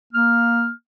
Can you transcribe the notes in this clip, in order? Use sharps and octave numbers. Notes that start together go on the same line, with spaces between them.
A#3 F6